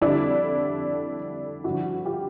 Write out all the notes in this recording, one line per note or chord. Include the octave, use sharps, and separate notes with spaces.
F2 D3 G3 D4 E4
G2 D3 F3 E4 F#4
F4 G4